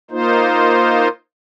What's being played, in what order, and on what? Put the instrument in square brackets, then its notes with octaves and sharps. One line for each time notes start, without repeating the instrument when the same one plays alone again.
[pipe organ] A#3 D#4 F4 C5